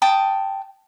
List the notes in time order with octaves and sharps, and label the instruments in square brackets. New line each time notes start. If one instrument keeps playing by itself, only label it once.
[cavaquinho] G5 A5 D#6